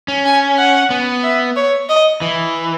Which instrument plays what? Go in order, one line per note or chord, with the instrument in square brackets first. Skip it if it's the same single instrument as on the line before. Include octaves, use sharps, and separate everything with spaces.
[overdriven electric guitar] C#4
[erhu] G#5
F#5
[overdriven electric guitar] B3
[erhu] E5
C#5
D#5
[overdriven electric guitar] E3